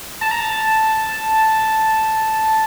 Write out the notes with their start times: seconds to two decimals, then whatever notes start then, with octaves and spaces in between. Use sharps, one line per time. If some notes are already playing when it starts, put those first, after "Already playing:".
0.21 A5
0.31 A#5
0.40 A5